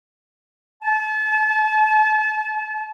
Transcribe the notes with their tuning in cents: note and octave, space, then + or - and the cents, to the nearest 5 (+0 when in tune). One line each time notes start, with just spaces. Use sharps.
A5 -35